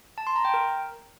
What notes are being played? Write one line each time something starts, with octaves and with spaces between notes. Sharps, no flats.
A5
C6
A#5
G5
A#4